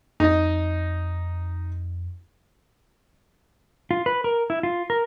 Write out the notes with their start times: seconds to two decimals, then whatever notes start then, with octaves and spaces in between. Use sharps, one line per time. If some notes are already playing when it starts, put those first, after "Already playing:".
0.20 F2 D#4 D#5
3.91 F4
4.06 B4
4.24 A#4
4.50 E4
4.63 F4
4.90 A#4